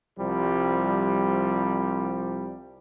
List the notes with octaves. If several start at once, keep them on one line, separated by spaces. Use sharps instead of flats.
C2 F3 G3